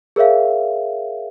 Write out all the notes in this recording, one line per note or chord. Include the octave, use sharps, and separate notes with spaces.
G#4 A#4 C#5 E5 F5